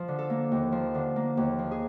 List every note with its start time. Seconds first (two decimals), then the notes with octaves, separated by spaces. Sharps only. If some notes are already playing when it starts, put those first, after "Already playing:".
Already playing: F3
0.08 D3
0.19 A4
0.30 A#3
0.52 D#2
0.72 F3
0.95 D3
1.16 A#3
1.37 D#2
1.59 F3
1.71 G#4